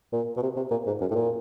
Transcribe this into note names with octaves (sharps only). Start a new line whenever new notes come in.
A#2
B2
C3
C3
A#2
G#2
F#2
A2
A#2